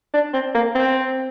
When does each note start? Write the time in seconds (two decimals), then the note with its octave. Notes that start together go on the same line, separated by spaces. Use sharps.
0.14 D4
0.33 C4
0.55 A#3
0.75 C4